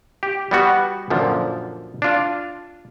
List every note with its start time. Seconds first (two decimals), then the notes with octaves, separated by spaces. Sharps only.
0.23 G4
0.51 G3 B3 F#4
1.10 F#2 A#2 D3 F3
2.02 D4 F4